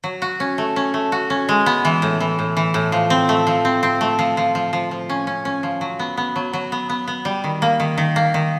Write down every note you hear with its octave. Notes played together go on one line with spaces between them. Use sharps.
F#3
F#4
C#4
A3
C#4
A3
F#4
C#4
G#3
B3
E3
A2
E3
A2
E3
A2
F3
C4
A3
F3
C4
C4
A3
F3
F3
F3
F3
F3
C#4
C#4
C#4
F3
F#3
B3
B3
F#3
F#3
B3
B3
B3
G3
D#3
A#3
D#3
D#3
A#3
D#3